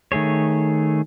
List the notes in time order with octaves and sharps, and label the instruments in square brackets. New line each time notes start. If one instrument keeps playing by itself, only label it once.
[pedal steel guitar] D#3 A3 G#4 C#5